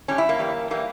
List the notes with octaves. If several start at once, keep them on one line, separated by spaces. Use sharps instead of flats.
A2 G3 C#4
E4
A#3
E2 E3 G3
E3 G3 A#3